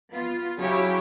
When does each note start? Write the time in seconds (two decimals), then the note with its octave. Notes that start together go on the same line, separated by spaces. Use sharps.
0.11 B3 F4
0.58 C#3 F#3 E4 G4 C#5